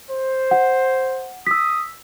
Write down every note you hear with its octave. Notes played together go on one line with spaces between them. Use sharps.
C5
F#5
D#6 E6 B6